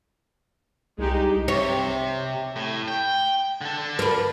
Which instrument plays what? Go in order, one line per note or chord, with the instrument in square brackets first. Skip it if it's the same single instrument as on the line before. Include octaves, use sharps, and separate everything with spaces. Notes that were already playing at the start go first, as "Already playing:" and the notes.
[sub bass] C2 [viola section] G#3 D#4 G4
[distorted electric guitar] C3 [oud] C#5
[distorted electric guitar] A2
G5
D3 A4
[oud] A#4 B4